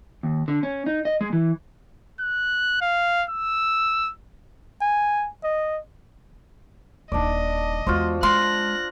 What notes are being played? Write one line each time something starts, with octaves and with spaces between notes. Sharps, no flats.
D#2
D3
C#4
D#4
D#5
G#3
E3
F#6
F5
E6
G#5
D#5
D#1 D4 D#4 D5 D#5
E2 G#3 F4 F#4 C5
G#3 F5 C6 F#6 A#6